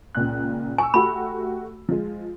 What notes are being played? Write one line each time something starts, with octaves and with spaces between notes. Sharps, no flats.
C#2 A#2 F#6
G#5 C#6 E6
A3 F#4 G4 B5
F3 G#3